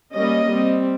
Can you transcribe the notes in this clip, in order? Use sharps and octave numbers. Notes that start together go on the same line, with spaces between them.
G3 A#3 C#4 D#5
G3 C4